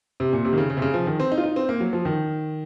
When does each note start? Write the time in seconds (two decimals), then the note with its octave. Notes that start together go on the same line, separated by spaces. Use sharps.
0.20 C3
0.33 A#2
0.45 C3
0.53 D#3
0.58 C#3
0.70 C#3
0.77 C3
0.82 C#3
0.94 F3
1.07 D#3
1.20 C4
1.32 D#4
1.38 F4
1.44 D#4
1.56 C4
1.69 A#3
1.80 F#3
1.93 F3
2.05 D#3